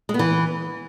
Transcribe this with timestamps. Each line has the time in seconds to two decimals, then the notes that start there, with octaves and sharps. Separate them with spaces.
0.09 G#3
0.14 B3
0.19 E3